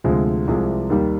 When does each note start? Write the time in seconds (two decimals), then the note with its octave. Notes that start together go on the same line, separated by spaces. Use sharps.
0.04 D2 C3 F3 G#3
0.47 C2 C3 F3 G#3
0.90 D#2 D#3 G3